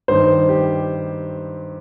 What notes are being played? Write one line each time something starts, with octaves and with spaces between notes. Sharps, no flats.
G2 D#3 C5
G4